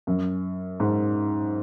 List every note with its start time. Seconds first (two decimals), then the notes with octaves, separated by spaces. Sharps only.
0.07 F#2
0.80 G#2